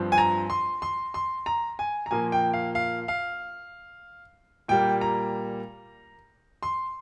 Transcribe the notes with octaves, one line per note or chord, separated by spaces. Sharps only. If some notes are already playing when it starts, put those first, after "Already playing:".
Already playing: G2 F3 C4
G#5
A#5
C6
C6
C6
A#5
G#5
A#5
A#2 F3 A#3 G#5
G5
F5
F5
F5
A#2 G3 A#3 G5
A#5
C6